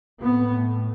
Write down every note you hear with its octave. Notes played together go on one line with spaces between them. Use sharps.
A2 B3